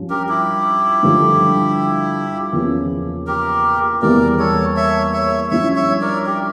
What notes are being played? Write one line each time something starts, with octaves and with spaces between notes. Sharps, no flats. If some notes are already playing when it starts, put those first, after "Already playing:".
Already playing: G2 F3 C#4
G4 A#4
E4 G4
G2 D3 F3 A3
E2 C#3 F3 A#3 C#4
G4 A#4
E2 E3 G3 A#3 A#4 D5
A4 C#5
C#5 E5
C#5 E5
G2 F3 C#4 E4 C#5 E5
C#5 E5
A#4 D5
G4 A#4